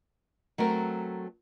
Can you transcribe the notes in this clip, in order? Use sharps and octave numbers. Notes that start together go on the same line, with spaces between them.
F#3 A3 C4 A#4